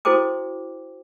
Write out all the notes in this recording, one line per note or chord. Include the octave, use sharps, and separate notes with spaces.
E4 F#4 A4 C5 G5 D6